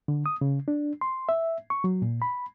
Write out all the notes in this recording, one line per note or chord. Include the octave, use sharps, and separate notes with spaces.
D3
D#6
C#3
D4
C6
E5
C#6
F#3
A#2
B5